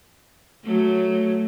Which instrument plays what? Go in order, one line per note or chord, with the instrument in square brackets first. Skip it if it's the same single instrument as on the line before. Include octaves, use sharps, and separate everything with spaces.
[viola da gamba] F#3 A3